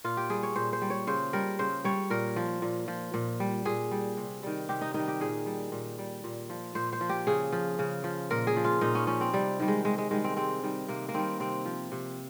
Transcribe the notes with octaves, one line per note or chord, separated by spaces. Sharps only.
A#2 F4
G4
G3 G#4
C#5
A#2 C5
C5
G3
C#5
C#3 C5
G3 A#4
C#3 C5
G3 C#5
A#2 A#4
F3
A#2
F3
A#2
G3
A#2 G#4
G3
C3
D#3 G3
C3 G4
D#4
D#3 G3 D#4
G4
A#2 G#4
G3
A#2
G3
A#2
F3
A#2 C5
C5
F3
G4
C#3 G#4
F3
C#3
F3
A#2 A#4
G#4
F3
F4
A#2 D#4
C#4
F3 C#4
C4
C3 G3
D#3 G3
G#3
C3 G#3
G#3
D#3 G3 G#3
C4
C3 C4
D#3 G3
C3 A#3
A#3
D#3 G3 C4
C3 C4
F3
C3